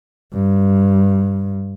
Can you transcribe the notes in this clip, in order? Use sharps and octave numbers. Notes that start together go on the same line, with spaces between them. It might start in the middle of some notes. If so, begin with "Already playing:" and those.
G2